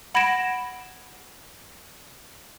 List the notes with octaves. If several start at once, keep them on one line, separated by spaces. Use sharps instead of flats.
F#5 B5 G#6 A#6 D7 E7